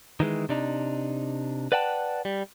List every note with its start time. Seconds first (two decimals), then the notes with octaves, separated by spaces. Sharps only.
0.20 D#3 E3 G#3
0.49 C3 D4 D#4
1.72 B4 D5 F#5 G5 A5
2.25 G3